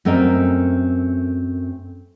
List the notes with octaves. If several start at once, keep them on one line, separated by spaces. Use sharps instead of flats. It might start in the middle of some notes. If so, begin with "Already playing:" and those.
F#2 A3 C4 A#4 D#5